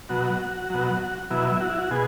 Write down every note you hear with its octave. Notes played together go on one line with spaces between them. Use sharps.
B2 F#3 F#4
B2 F#3
B2 F#3 E4
F#4
E4
F#4
B2 G#4